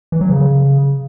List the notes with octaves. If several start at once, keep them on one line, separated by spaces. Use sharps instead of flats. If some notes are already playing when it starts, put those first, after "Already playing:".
E3
F#3
C#3